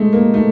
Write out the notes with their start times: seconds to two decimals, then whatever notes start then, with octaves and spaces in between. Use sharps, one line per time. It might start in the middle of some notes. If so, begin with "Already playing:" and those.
Already playing: G#3 A3
0.13 A#3
0.34 A3